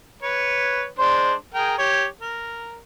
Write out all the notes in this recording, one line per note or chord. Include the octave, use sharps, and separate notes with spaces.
B4 C#5
G#3 D4 C5
G#4 A#4 G5
G4 C#5
A#4